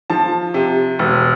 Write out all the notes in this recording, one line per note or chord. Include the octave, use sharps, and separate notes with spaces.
F3 A5
C3
E1